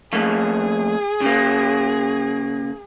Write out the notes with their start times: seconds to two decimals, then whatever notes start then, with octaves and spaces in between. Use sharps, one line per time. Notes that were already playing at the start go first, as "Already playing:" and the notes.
0.13 F3 A3 A#3 G#4
1.21 C#3 A#3